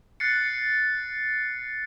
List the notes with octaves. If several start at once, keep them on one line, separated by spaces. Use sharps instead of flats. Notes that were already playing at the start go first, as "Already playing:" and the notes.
F#6 A6 C7 C#7